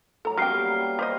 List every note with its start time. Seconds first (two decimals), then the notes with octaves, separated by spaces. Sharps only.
0.25 A2 F#3 A4 A#5
0.38 F#3 G3 A#3 B3 C#4 G5 F6 C7
0.99 G4 C5 D#5 C#6